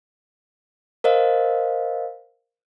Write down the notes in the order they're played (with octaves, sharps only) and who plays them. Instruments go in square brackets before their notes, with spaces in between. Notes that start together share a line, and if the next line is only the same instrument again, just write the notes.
[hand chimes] A#4 C5 D#5 F5